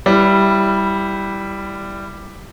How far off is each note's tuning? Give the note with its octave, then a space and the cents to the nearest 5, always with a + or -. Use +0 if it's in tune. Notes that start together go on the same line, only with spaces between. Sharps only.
G3 +0 E4 +5 B4 +25